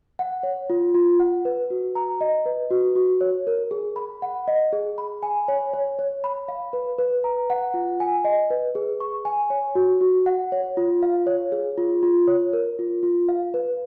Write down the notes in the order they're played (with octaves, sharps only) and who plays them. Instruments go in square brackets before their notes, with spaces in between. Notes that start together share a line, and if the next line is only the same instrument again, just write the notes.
[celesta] F#5
C#5
F4
F4
F#5
B4
F#4
A#5
D#5
B4
F#4
F#4
C#5
A#4
G#4
B5
F#5
D#5
G#4
B5
G#5
C#5
C#5
C#5
B5
F5
B4
B4
A#5
F#5
F4
G#5
D#5
B4
G#4
C#6
G#5
C#5
F#4
F#4
F#5
C#5
F4
F5
C#5
G#4
F4
F4
C#5
A#4
F4
F4
F5
B4